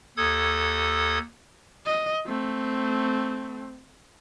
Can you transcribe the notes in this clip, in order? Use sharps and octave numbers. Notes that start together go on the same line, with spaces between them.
D#2 A4 D#6 G#6
D#5
A3 C4